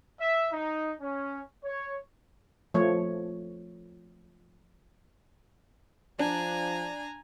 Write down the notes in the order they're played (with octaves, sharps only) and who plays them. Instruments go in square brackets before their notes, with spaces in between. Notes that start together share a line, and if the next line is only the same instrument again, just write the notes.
[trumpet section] E5
D#4
C#4
C#5
[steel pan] F3 A3 C#5
[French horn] F3 [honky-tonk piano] D4 [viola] G#5 A#5